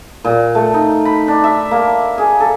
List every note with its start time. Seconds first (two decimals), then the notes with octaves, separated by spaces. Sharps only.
0.25 A#2
0.55 A3
0.74 D#4
1.05 B5
1.28 D4
1.44 E5
1.71 A#3
2.18 G#4
2.40 A4